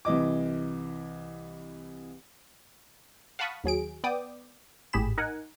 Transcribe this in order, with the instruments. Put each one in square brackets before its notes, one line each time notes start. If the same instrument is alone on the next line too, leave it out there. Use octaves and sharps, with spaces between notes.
[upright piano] C2 E3 D#5 D6
[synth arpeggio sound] F5 F#5 A5 B5 C#6 D#6
D#2 F#3 G#4 D7
B3 D5 G5 D6 D#6
G#1 A2 G4 G#4 B5 E7
D#4 A#4 F#5 G#5